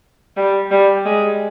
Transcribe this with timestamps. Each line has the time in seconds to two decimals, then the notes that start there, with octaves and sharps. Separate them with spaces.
0.37 G3
0.71 G3
1.05 G#3